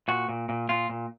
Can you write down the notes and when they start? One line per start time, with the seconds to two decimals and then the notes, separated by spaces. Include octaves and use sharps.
0.08 A#2 F#4
0.29 A#2
0.49 A#2
0.69 A#2 F4
0.90 A#2